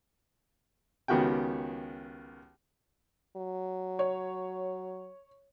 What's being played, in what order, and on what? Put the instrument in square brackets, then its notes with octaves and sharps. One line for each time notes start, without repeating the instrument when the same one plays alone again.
[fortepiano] C#2 D#3 B3 F#4 G4 G5
[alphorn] F#3
[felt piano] C#5